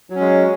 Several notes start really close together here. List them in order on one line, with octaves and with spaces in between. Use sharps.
F#3 C#4 G#3